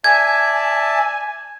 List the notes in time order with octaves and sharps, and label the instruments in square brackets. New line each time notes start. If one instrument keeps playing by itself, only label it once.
[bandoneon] D5 E5 A5 [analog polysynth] G#5 [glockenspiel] G#6